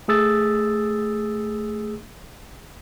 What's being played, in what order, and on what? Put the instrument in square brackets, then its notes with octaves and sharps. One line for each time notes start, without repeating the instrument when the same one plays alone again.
[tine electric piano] A3 G#4 D#6 E6 A6